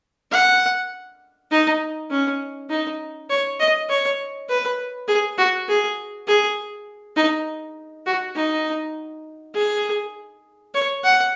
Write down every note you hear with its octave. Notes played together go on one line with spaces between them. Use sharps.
F#5
D#4
C#4
D#4
C#5
D#5
C#5
B4
G#4
F#4
G#4
G#4
D#4
F#4
D#4
G#4
C#5
F#5